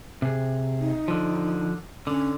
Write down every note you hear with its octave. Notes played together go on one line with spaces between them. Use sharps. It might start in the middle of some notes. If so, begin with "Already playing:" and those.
C3 G#4
D#4
D3 F3
D3 C#4